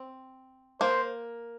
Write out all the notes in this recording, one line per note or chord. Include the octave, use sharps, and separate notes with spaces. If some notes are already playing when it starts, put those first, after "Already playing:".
Already playing: C4
A#3 C5